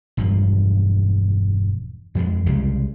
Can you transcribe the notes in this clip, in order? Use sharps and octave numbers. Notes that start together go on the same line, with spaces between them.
E1 G2 F3
F2 F3 G3 G#3
C2 C#3 G3 G#3